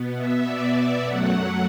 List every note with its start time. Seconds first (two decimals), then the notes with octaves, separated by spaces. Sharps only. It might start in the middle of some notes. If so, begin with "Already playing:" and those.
Already playing: B2 B3
0.16 E5
0.44 D5
1.02 F#2 F#3 A3 F#5